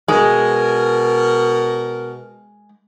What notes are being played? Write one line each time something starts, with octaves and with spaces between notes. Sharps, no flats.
B2 G#3 A#4